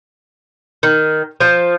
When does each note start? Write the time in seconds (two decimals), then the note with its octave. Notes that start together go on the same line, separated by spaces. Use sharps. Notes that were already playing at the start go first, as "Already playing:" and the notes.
0.83 D#3
1.40 F3